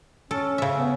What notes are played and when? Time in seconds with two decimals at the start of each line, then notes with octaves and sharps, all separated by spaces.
0.31 C#4 A4
0.58 C#3 E5
0.76 B3